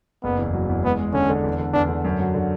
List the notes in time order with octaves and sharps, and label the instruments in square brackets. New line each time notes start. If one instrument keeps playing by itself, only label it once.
[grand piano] F#1 [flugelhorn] B3
[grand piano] E2
F#3
E2
[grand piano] G#3 [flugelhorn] B3
[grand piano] G#3
[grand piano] D3 [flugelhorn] C#4
[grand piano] D3
E2
D3
[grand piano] E2 [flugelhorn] D4
[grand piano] D3
F#2
F#3
D3